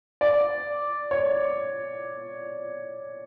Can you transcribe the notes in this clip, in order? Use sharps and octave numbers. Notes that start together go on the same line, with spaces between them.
D5
C#5